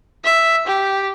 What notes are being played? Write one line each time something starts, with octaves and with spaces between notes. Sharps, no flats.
E5
G4